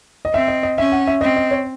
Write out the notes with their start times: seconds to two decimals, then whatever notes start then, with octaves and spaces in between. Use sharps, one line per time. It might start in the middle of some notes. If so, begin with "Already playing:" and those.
0.25 D#5
0.33 C4 E5
0.48 D#5
0.63 D#5
0.78 C#4 E5
0.92 F#5
1.07 E5
1.21 C4 D#5
1.36 D#5
1.51 C#5